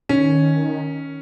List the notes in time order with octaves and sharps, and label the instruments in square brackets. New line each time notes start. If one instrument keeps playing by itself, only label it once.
[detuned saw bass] D#3 [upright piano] C#4